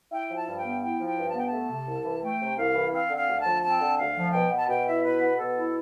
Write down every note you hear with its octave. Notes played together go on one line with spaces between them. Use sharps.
E4 G5
F3
A5
G2
G5
B3
E4 G5
F3
G5
G2
A5
B3 G5
A5
A3
C3
C2
E3
A3 G5
C3
C2 F5
E3
C4 F5
D3
F5
D2
A5
F3
C4 A5
D3
D2 F5
F3
B2 G5
B3
A5
B2 G5
E4 E5
B2 B4
B3
B2 A4
E4